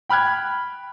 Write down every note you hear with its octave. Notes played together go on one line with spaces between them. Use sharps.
G5 B5 F6 F#6 G#6